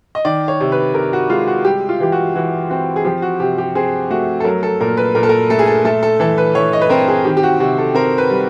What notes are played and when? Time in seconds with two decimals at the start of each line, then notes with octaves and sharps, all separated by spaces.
0.15 D#5
0.25 D#3 D5
0.48 C#5
0.60 C3
0.72 B4
0.94 C3 A#4
1.13 F#4
1.30 G#3 F4
1.47 F#4
1.65 G3 G4
1.89 F4
2.00 E3 G4
2.12 F#4
2.35 E3 F#4
2.70 C4 F#4
2.96 G#4
3.05 F3 G4
3.22 F#4
3.40 C3 G4
3.58 G4
3.75 C4 G#4
4.10 A3 F#4
4.40 A4
4.44 F#3 A#4
4.63 A4
4.80 A#2 A#4
4.97 B4
5.15 A#2 A#4
5.23 A4
5.29 A#4
5.50 A3 A4
5.59 G#4
5.67 A4
5.85 A3 A4
6.03 A4
6.20 E3 A4
6.38 B4
6.55 E3 C#5
6.73 D#5
6.81 B4
6.90 C4 A#4
7.08 G#4
7.25 D#3 G4
7.37 G4
7.43 F#4
7.60 C3 F#4
7.78 A4
7.95 C4 A#4
8.18 B4
8.30 G3